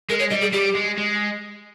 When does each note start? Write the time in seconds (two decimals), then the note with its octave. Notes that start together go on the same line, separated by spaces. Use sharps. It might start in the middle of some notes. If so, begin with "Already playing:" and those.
0.10 G#3 A#4
0.19 C#5
0.30 G3 D#5
0.41 G#4
0.53 G3 G4
0.75 G#3
0.97 G#3